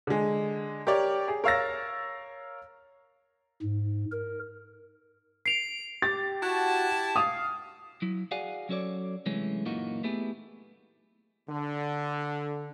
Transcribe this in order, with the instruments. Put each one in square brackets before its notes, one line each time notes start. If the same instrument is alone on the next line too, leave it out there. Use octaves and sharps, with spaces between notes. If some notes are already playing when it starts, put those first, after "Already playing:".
[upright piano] D3 G#3
G4 A#4 C#5 D5
G#4
A#4 C#5 F5 E6 A6 A#6
[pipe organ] G#2
A#4
[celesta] C7 F7 [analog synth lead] D7
[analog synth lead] G4 [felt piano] A6
[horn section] E4 G4 A5 [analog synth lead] F#4
[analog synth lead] F5 [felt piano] D#6
[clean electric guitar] F#3 E4
F#4 G#4 D5 F5 F#5 G#5
F#3 C#4 F#4 A4 C#5 D5
C3 E3 F#3 G#3 A3 C#4
F#2 A#2 E3 A#3 D#4 F#4
A3 B3 E4 G4 G#4
[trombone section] D3